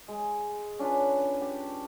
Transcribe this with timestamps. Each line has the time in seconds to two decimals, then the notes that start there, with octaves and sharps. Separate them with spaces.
0.08 G#3
0.79 C#4 D4 F4 B4
1.41 G4